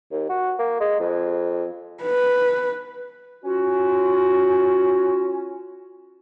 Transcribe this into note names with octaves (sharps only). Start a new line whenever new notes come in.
D#2
F#4
A#3
G#3
F2
B4
C#4 F4 F#4